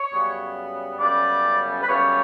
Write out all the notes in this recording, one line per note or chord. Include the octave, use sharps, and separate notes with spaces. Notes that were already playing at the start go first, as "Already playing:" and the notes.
Already playing: C#5
F#2 C#3 G3 B3
F#2 C#3 G3 B3 D5
B4
F#2 C#3 G3 B3 C#5